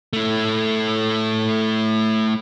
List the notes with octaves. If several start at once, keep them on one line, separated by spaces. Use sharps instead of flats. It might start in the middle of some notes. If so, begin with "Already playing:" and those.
A3 E4